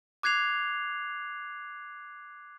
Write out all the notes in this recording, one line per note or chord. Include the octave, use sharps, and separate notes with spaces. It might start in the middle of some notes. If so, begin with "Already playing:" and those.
D6 F#6 G#6 C7 F7